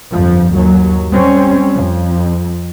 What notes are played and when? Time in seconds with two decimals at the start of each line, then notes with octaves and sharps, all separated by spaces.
0.12 G1 F2 F3
0.54 D#2 F#3
1.12 G3 C4 C#4
1.74 F2